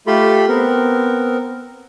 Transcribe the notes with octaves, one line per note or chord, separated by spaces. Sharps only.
A3 F4 G4 A4 B5 C6
B3 C4 A#4